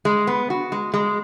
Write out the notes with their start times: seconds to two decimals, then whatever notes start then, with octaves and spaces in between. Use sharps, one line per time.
0.05 G#3
0.27 B3
0.50 F#4
0.72 G#3
0.94 G#3